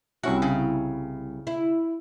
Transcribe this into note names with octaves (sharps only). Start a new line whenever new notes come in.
C2 C#4 E4 F#4 F#5
C#3
E4